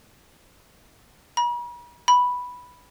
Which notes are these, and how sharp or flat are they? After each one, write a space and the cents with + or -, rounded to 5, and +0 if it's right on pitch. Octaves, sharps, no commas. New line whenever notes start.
B5 -45
B5 -5